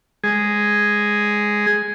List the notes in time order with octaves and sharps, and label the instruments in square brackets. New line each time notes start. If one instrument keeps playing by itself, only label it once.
[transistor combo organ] G#3 G#4